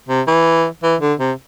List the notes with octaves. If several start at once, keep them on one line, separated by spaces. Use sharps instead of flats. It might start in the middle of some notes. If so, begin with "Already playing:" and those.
C3
E3
E3
D3
C3